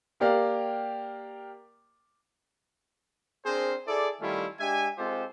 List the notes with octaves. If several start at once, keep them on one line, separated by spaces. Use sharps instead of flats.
A#3 G4 A#4 D5 F5
C4 D4 G#4 A#4 C5
E4 G#4 A4 D5
D#3 G3 A3 C#4 E4 F4
G#3 D4 G4 E5 G#5
G#3 C4 F4 G4 A4 C5